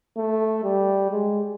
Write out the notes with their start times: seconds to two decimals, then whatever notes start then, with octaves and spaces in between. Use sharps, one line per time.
0.17 A3
0.64 G3
1.11 G#3